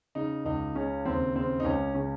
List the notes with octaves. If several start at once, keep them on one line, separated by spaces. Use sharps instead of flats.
C#3 D#4
C#2 D#4
C#3 C#4
D#2 C4
C#3 C4
D#4
C#2 C#4
C#3 C#4